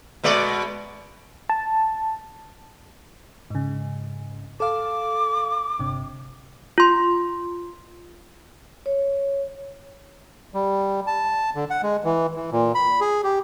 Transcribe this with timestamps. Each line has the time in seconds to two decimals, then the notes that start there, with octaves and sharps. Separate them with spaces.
0.23 B2 G#3 D5
1.49 A5
3.50 G#2 C#3
4.60 A4 F5 D6
5.80 G1 C3
6.78 F4 C6
8.86 C#5
10.54 G3
11.07 A5
11.55 D3
11.70 F#5
11.83 G#3
12.04 E3
12.36 E3
12.52 A#2
12.75 B5
13.01 G#4
13.24 G4